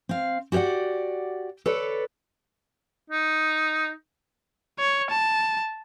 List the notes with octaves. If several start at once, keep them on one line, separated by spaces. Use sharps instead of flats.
C4 F5
F#4 G4 C#5 D5 F#5
A4 B4 C#5 D5
D#4
C#5
A5